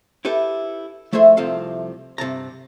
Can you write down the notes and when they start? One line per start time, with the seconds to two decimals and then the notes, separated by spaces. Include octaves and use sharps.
0.25 E4 G4 A4 B4
1.13 F3 A3 E4 G#4 C5 E5
1.37 C2 C3 F3 A4 F5
2.18 G2 C3 A5 A#5